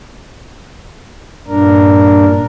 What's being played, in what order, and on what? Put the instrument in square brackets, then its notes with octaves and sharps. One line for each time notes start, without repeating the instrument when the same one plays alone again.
[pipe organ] G2 A#2 D4 A#4